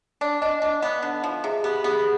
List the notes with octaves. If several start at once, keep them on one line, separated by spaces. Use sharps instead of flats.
D4 D5
D4 D#5
D4 D#5
B3
D3
F3
C3 G#4
B3 G4
B3 G#4